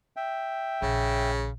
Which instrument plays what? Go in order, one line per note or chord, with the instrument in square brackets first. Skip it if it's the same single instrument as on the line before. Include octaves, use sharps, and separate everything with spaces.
[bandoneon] E5 G5
[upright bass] A#1 [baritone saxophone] C#3